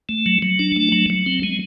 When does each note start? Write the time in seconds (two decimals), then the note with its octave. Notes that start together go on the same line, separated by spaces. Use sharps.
0.09 A3
0.26 F#3
0.42 F#3
0.59 D4
0.76 A3
0.92 F#3
1.10 F#3
1.26 C4
1.43 G#3